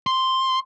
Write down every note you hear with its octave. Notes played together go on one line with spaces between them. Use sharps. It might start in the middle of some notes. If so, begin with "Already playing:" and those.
C6